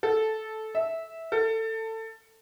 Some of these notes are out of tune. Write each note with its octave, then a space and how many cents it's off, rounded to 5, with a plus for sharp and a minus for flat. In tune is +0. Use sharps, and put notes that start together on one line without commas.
A4 -10
E5 -10
A4 +20